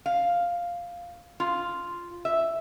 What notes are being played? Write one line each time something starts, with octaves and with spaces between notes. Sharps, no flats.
F5
F4
E5